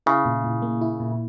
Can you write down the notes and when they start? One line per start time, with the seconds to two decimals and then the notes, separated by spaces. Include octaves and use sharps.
0.06 C#3 E4
0.25 A#2
0.44 A#2
0.62 A#3
0.81 E4
1.00 A#2